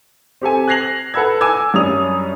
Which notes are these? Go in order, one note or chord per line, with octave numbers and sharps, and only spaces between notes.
C4 G4 A4 G#5
F#6 G#6 A#6 C7 F7 F#7
A4 B4 F#5 B5 E6 G#6
G#5 D6 E6 G#6
F#2 G3 C#4 D4 D#6 F7